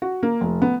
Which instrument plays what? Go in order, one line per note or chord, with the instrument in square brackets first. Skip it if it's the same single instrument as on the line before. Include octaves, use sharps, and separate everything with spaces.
[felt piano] F#4
A#3
F1
B3